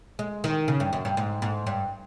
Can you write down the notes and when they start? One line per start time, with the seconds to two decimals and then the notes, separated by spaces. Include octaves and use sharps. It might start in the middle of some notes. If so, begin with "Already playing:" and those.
0.19 G#3
0.44 D#3
0.68 C#3
0.80 G2
0.93 F#2
1.05 G2
1.17 G#2
1.42 G#2
1.67 G2